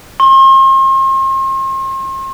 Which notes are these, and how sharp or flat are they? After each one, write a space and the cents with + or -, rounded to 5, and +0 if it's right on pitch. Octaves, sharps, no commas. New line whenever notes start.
C6 +40